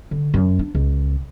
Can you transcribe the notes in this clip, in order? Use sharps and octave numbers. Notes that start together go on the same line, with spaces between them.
D3
F#2
D4
C#2